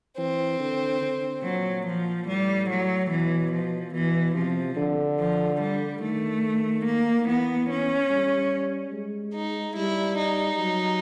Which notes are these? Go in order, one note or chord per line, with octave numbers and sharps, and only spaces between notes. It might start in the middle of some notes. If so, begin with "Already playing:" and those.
E3 C4
D3
D3
A#2 F#3
F3
A2 G3
F#3
B2 E3
F3
B2 E3
C3 F3
D3
F3
G3
D#3 A3
A#3
E3 B3
C#4
G3
G#3
D#4
G3 E4
D#4
F#3